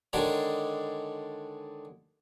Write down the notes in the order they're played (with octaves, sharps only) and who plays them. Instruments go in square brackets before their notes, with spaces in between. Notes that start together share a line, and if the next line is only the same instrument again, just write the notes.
[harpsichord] D3 D#3 G#3 D4 G#4 C#5